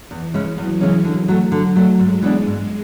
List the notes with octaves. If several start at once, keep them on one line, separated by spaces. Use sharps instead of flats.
E2 E3
C#3 E3 G#3 C#4
E2 F#3
C#3 E3 G#3 C#4
D3
F#3 A3
D3 F#3
F#3 A3
G#2 G#3
E3 B3 D4
G#2 G#3